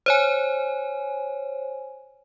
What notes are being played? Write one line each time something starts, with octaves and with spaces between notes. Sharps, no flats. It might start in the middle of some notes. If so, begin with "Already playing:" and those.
C5 C#5 G#5